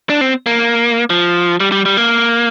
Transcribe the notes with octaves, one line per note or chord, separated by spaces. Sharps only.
D4
C4
A#3
F3
G3
G3
G3
A#3